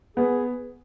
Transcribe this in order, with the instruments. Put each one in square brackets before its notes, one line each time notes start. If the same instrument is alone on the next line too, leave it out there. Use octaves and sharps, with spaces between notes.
[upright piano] B3 [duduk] G#4